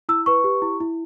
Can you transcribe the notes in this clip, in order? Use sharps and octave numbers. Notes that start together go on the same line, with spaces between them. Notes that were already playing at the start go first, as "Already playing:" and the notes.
E4 E6
B4 C#6
G4
E4
E4